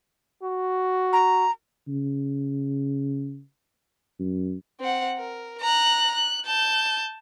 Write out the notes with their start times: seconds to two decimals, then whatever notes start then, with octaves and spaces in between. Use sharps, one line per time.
0.43 F#4
1.13 A#5
1.88 C#3
4.19 F#2
4.80 C4 F#5
5.18 A#4
5.61 A#5 F#6
6.15 F#6
6.46 A5 G6